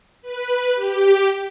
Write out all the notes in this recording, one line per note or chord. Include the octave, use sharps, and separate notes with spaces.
B4
G4